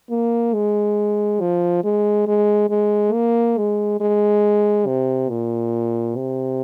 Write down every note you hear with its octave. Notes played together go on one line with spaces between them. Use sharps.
A#3
G#3
F3
G#3
G#3
G#3
A#3
G#3
G#3
C3
A#2
C3